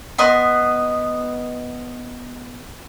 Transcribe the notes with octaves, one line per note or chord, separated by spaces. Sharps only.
B3 D#5 C6